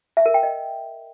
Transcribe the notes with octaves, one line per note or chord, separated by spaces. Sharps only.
E5
A#4
G5
D#5